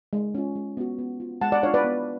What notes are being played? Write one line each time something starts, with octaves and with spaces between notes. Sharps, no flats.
G#3
C#4 F4
G#3
B3 F#4
B3
F4
G#3 F#5 A5
D5 F#5
D4 F4 C#5 F5
B4 D5
B3